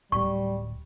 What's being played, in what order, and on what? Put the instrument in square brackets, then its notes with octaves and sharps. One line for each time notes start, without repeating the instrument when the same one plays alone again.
[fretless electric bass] D1 [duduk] G3 [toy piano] C#6